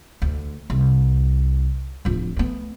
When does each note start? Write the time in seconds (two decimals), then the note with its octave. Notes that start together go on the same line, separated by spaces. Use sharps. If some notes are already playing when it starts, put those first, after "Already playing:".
0.22 D2
0.70 C2
2.05 D1 F3
2.36 A3 B3